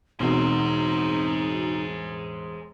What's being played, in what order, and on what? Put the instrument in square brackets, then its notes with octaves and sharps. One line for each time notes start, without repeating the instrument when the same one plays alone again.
[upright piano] E1 [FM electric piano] B2 C4 F#4 [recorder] D#4 [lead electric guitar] G#4 C5